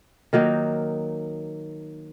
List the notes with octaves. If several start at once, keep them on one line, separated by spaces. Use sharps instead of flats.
D#3 F#3 A#3 D#4